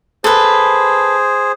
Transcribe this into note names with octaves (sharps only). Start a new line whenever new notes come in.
G#4 A4 B4 C5